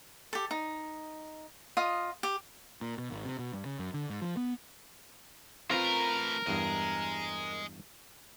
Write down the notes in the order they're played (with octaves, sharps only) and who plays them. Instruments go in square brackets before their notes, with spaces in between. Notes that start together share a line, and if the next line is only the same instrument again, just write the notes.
[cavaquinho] G4 A4
D#4
F4 D#5 D#6
G4
[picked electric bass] A#2
B2
G#1
C3
B2
G2
C#3
F#2
D3
G#2
F3
B3
[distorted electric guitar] A3 B4 [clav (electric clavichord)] C4 F4 [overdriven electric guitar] A#4
[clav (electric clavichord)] E2 G2 [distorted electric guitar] D#5 G#5